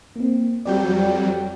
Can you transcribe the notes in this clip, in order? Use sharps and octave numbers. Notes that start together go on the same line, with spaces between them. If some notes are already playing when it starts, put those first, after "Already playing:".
A#3 C4
F2 F#3 G3 D5 G5 G6